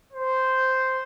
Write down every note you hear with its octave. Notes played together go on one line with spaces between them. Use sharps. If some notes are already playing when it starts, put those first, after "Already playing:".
C5